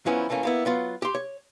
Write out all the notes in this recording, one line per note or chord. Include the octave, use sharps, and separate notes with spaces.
F#2 E3 F3 B3 C#4 E4
E3 A3 A#3 C#4
A#3 B3 E4
F#3 B3 F4
G4 C6
C#5